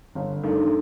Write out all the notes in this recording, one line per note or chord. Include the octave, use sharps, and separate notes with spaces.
G1
G2 D#3 A3